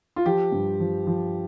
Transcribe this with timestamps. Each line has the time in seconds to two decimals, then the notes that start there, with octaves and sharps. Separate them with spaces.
0.16 F4
0.26 F3 G4
0.52 G2
0.80 F3
1.07 F3